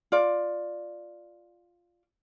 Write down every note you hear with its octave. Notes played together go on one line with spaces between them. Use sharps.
F4 D5